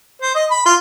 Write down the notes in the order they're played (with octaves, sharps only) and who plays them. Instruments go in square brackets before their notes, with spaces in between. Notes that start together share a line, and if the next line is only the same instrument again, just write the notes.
[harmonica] C5
D#5
B5
F4